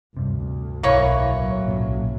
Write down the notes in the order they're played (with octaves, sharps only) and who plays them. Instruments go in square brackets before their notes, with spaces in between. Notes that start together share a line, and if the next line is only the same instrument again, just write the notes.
[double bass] D2 [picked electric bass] G2 C3
[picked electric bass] B1 [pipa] E3 A#3 C#5
[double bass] A2 F#3
[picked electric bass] B1 F#2 A#2